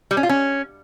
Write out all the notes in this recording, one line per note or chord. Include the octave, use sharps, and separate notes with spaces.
G3
C#4
F4
C#4